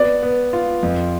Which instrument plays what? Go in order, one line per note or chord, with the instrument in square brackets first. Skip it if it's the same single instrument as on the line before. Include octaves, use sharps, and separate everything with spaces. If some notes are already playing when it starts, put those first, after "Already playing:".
Already playing: [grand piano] B3 [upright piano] D5
[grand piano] B3
F4
F2